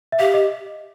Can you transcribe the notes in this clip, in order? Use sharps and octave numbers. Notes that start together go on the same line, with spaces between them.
E5
G4 F5
D#5